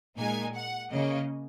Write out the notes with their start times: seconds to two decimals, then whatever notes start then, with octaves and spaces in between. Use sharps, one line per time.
0.18 A#2 G#3 D#4 G#5
0.55 F#5
0.91 C#3 A#3 C#4 D#5